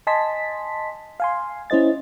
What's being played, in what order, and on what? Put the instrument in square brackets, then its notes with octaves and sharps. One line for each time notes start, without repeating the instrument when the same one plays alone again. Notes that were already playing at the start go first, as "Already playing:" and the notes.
[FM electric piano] D#5 G#5 A5 C6 B6
F5 G#5 C6
C#4 E4 C5 D#5 A6